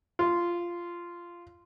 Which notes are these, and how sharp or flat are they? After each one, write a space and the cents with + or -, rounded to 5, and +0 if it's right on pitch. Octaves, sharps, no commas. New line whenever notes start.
F4 -10